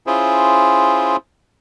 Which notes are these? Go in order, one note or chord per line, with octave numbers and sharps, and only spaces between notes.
C#4 E4 F4 G#4 C5